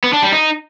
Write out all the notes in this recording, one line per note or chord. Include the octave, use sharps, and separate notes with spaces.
B3
D4
G3
D#4